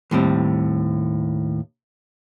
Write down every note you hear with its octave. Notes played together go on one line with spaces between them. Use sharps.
D#2 A2 G3 C4